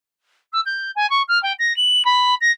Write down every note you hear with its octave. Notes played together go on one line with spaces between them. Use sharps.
E6
G6
G#5
C#6
F6
G5
A#6
F#7
B5
A#6